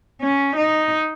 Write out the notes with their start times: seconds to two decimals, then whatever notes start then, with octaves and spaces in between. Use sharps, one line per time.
0.21 C#4
0.56 D#4